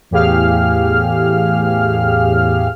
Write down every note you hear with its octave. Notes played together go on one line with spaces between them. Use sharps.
E2 A2 G4 G#4 F5 F6